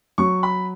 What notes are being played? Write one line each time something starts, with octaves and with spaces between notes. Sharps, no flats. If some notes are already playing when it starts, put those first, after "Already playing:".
F#3 C#6
B5